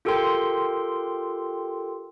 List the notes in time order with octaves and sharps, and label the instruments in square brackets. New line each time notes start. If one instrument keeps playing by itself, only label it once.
[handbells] F4 G4 A4 A#4 G5 C6